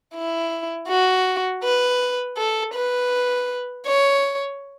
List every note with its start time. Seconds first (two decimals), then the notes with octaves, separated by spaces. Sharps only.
0.15 E4
0.88 F#4
1.63 B4
2.37 A4
2.74 B4
3.86 C#5